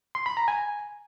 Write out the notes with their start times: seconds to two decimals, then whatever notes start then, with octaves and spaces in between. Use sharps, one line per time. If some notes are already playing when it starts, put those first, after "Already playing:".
0.15 C6
0.26 B5
0.37 A#5
0.48 G#5